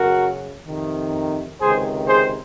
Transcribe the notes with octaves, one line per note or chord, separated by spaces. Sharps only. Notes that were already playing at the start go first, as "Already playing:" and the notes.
Already playing: F#2 C#3 F#4 A#4
F2 C3 D#3
C#2 C3 D#3 G#4 C5
G#4 C5